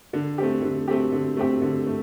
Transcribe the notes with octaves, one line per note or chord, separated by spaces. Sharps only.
D3
A3 C4 G4
D3
A3 C4 G4
D3
A3 C4 G4
D3
A3